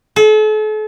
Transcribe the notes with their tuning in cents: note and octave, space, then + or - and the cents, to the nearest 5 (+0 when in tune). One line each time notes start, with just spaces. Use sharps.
A4 -40